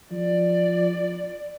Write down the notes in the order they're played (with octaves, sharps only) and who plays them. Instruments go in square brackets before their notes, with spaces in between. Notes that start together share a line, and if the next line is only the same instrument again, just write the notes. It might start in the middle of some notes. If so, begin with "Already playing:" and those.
[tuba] F3 [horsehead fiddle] D5